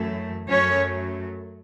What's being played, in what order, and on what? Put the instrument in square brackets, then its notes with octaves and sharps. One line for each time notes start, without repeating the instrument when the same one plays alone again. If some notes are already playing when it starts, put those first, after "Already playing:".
Already playing: [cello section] F#2 E3 A3
F#2 F#3 A3 C#4 C#5